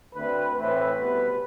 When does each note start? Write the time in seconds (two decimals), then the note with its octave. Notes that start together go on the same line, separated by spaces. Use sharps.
0.14 D2 D3 A3 C4 B4
0.56 A2 E3 A3 C4 B4
0.97 C2 B2 B3